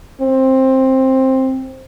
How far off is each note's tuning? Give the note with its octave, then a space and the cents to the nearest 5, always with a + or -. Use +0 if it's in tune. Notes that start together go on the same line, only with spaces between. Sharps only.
C4 +10